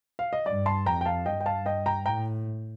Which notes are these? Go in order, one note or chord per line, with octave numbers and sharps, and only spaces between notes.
F5
D#5
G2 D5
A5 C6
F2 G5 A#5
G5
F5 A5
G2 D#5 G5
G5
F5 A5
D#5 G5
G5 A#5
A2 G5 A#5